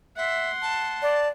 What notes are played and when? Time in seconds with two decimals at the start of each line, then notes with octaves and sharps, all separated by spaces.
0.17 E5 F#5 C6
0.62 A5
1.02 D5